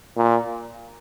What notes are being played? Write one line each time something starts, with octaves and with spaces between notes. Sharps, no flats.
A#2